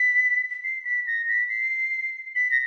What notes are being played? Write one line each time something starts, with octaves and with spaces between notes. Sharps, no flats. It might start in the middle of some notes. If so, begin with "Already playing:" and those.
Already playing: B6
C7
B6
A#6
B6
C7
B6
A#6